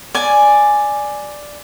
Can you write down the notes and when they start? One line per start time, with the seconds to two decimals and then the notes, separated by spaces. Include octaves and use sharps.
0.15 D5 G#5